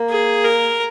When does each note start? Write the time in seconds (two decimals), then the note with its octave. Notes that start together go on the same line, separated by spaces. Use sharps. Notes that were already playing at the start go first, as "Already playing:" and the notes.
Already playing: A#3
0.09 G#4
0.44 A#4